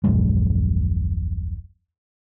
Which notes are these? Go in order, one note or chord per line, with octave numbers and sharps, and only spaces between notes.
D#1 A#1 F#2 G#3